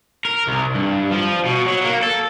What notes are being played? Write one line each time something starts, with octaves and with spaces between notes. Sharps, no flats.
A#4
C2
G2
F3
B2
F#3
A#3
A4